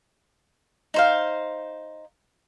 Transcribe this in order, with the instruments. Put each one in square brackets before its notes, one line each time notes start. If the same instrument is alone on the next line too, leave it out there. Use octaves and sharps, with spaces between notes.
[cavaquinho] D#4 C5 F5